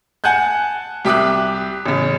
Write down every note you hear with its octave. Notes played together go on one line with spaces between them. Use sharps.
F#5 G#5 A5 F#6 G6
C2 G4 E5 D6 D#6 F#6
A1 C#3